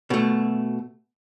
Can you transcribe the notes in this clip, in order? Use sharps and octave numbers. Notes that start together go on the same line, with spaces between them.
B2 A3